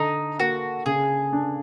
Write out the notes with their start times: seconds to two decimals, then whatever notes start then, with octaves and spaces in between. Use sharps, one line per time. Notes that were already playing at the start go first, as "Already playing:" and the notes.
Already playing: D3 D#4
0.40 A#3 F#4
0.86 C#3 G#4
1.33 D4